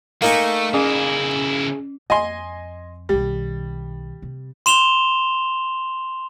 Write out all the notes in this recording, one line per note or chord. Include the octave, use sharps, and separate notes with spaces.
A3 A#3 D#4 G#5
C#3 C#4 E4 G#4
F2 D#5 G#5 C6
B1 D#3 G3
C3
C6 E7 F7 G7